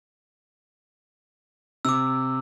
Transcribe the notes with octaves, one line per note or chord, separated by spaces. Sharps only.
C3 D6 E6